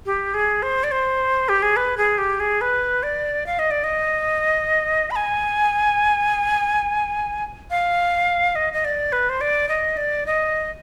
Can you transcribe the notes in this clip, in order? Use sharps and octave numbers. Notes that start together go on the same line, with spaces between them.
G4
G#4
C5
D5
C5
G4
G#4
B4
G#4
G4
G#4
B4
D5
F5
D#5
D5
D#5
B5
G#5
F5
D#5
D#5
D5
B4
C5
D5
D#5
D5
D#5